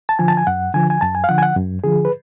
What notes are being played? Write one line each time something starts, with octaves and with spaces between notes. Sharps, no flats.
A5
D3 F3 G#5
A5
G#5
F#2 F#5
D3 F3 G#5
G#5
F#2 A5
G#5
F5
D3 F3 F#5
G#5
F#5
F#2
D3 F3 G#4
B4